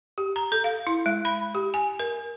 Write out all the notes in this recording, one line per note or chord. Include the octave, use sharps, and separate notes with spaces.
G4
A#5
A4
F5
E4
G#3
B5
G4
G#5
A#4